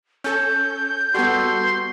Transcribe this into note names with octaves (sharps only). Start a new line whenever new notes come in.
C#4 A4 G6
G3 B3 F#4 A4 C6